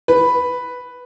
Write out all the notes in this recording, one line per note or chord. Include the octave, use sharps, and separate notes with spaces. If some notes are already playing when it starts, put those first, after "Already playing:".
B4